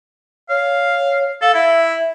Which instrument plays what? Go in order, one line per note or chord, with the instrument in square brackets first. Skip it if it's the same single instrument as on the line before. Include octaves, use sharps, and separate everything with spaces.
[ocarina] C#5 [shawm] F5
[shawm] A4 [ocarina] F5
[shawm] E4 [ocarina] E5